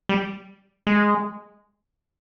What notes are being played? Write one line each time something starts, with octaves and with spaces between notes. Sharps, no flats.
G3
G#3